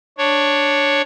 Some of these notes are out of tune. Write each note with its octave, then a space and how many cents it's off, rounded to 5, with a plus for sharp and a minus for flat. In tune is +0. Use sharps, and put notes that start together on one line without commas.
D4 +0 C#5 +0